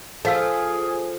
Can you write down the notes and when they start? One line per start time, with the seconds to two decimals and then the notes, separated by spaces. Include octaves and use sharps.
0.25 F3 G#4 A4 D#5 F5 E6